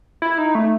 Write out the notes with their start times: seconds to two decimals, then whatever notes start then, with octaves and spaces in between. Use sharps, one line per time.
0.22 E4
0.38 D#4
0.55 A3